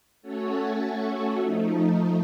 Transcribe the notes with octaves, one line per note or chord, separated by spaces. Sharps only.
A3 C#4 F#4 A4 C#5
F3 A3 D#4